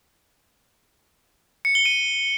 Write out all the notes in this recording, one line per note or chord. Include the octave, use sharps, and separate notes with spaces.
C#7
G7
D#7